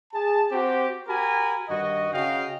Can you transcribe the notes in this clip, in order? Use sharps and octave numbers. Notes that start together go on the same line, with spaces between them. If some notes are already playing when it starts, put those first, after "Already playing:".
G#4 A5
C4 F#4 G4
F#4 G4 A#4 G#5 B5
G2 D#3 F#4 D#5
C#3 F#4 D#5 F5 G5